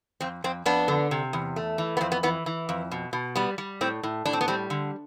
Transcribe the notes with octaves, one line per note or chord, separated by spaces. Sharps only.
F2 C4
F2 C4
F2 B3 D4
D3
C3
E2
A3
E3
B3
F2 C4
B3
E3 B3
E3
F2
B2
B2
G3 B3
G3
A2 C4
A2
A2 D4
C4
B3
G3 C4
D3